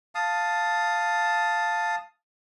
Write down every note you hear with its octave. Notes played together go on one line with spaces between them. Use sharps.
F5 A5 D#6